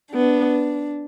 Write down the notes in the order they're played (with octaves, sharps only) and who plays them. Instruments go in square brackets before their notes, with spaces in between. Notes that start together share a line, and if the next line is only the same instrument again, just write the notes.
[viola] B3 [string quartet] D4